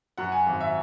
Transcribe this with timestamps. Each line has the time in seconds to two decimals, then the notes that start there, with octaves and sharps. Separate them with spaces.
0.18 F#2 F#5
0.32 G#5
0.47 G#1
0.61 E5